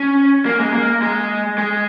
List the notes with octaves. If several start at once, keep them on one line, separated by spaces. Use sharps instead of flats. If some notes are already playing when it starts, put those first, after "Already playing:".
Already playing: C#4
A#3
G#3
A#3
G#3
G#3